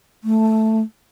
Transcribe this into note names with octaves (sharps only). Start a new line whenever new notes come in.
A3